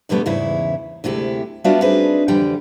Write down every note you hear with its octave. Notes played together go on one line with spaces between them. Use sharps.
F2 B2 D3 G3 A3 B3
E2 G#2 C#3 E3 E4
D2 C3 G#3 E4 G4
G3 B3 D4 F4 F#4 E5
C4 D4 D#4 G#4 B4
F2 D3 E3 G3 G5